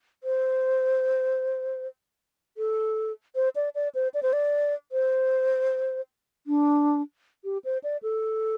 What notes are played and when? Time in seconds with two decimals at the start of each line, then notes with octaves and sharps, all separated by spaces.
0.24 C5
2.57 A4
3.35 C5
3.56 D5
3.75 D5
3.95 C5
4.14 D5
4.23 C5
4.33 D5
4.92 C5
6.47 D4
7.44 G4
7.65 C5
7.83 D5
8.03 A4